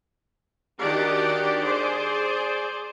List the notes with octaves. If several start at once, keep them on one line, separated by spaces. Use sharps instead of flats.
D#3 D4 F#4 G4 D5 F#5
G#4 C5 D5